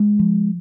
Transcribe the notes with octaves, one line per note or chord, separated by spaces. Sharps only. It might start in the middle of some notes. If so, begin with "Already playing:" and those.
Already playing: G#3
F3